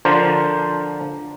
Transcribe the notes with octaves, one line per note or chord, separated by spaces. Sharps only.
D3 F3 D4 A#4 C5